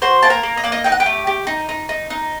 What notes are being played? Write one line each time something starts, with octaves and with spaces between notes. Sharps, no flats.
F#4 C5 C6
A#3 A5
A#4 A#5
A#3
D#5
A#3 D5
D#4 D#5
D#4 G5
F#5
G4 G5
A3
G4
D#4
D#4
D#4
D#4